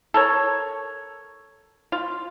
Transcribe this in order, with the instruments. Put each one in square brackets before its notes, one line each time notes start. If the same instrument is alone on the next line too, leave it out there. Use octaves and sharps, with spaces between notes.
[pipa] A4 A#4 C#5
F4